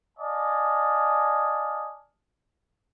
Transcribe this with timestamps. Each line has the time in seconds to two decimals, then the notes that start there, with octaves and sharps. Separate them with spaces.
0.18 D5 D#5 F5 G#5 A5